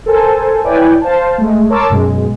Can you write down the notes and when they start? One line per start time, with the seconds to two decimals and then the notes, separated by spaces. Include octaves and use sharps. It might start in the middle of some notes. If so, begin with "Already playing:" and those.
0.06 A4 A#4 C5 G#5 A5
0.64 E4 B4 C#5 D5 G5 G#5
1.01 C5 F5 A5
1.38 G#3 A3
1.69 A#4 C#5 A5 C6 D6 E6
1.90 F#2 B2 G#3